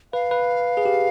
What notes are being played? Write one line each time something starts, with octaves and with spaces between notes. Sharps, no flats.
B4 F5
B4
G#4
G4